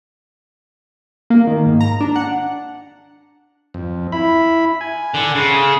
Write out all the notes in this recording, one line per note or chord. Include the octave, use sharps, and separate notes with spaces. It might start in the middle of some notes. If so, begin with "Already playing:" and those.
A#3
D#3
G#2
A#5
D4
F#5
F2
E4 B5
G#5
D3
C#3